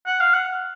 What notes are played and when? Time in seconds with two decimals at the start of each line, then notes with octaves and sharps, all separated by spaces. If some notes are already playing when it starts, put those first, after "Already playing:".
0.06 F#5
0.20 F5
0.33 F#5